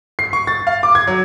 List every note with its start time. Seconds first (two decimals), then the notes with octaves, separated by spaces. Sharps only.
0.19 C7
0.33 C#6
0.47 A6
0.67 F5
0.83 D6
0.95 G#6
1.07 F#3